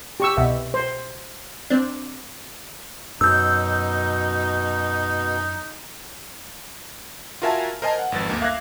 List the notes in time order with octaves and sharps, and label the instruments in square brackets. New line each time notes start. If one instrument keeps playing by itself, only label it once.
[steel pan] G4 C#6 E6
[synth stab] C2 B2 [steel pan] E5
[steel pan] C5
[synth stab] C4 D4
[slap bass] F#2 [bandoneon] B2 [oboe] D#4 [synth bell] E6 G6
[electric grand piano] F4 F#4 A#4 E5 G#5 A5
A#4 C5 D#5 G#5 A5
F#5
G#1 F2 B4 A6
G1 D2 A#3
E5 F5 D6 F#6 G#6 A#6